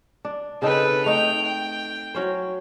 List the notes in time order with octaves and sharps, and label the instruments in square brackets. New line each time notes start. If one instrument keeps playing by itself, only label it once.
[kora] D4
[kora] C#3 C4 D#4 [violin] A4 B4
[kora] A3 D#4 [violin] G5 F7
[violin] G5
[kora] F#3 C#4 C5